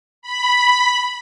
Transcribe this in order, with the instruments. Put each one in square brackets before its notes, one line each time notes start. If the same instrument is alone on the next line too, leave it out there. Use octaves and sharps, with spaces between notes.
[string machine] B5